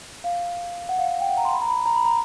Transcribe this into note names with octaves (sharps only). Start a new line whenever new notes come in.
F5
F#5
F5
F#5
G5
F#5
A#5
C6
B5
A#5
B5
A#5
B5
A#5